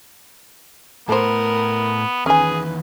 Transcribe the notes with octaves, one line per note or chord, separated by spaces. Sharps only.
A2 B3 A4 A#4 C5
E2 D#3 C#4 G#4 B4 G#5